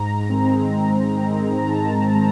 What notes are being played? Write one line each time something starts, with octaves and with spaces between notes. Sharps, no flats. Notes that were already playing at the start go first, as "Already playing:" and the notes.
Already playing: G#2 A#5
D#3 G#3 C4
G#2
D#3 G#3 C4
A#5
G#2 A5
A5
D#3 G#3 C4 A#5